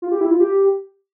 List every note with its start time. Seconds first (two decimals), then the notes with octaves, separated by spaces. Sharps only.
0.02 F4
0.12 G4
0.21 E4
0.31 F4
0.40 G4